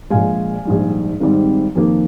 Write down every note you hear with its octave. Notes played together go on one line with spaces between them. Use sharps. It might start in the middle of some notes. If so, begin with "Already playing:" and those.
A#1 A#2 G#3 F5 G#5
A#1 G#2 D#3 G3
G#1 G#2 D#3 G3 C4
F2 D#3 A#3